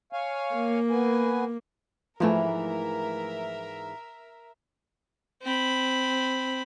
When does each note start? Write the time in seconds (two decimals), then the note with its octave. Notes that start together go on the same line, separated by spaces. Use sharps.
0.13 C#5 F5 G#5
0.55 A#3
0.90 B3 B4 G#5
2.20 G#2 E3 F3 A3 A#3 A#4 E5
5.42 C4 B5